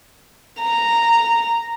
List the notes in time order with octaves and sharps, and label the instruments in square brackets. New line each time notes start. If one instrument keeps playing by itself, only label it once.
[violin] A#5